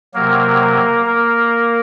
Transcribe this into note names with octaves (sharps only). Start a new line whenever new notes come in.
C3 F#3 A#3 A#4
A#3 A#4